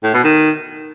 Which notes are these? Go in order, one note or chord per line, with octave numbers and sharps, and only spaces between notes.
A2
B2
D#3